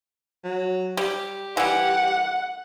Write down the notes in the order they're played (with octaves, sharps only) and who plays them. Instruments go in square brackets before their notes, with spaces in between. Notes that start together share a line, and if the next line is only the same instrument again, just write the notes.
[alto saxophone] F#3
[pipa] G3 [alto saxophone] G4
[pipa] E3 G3 [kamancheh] F#5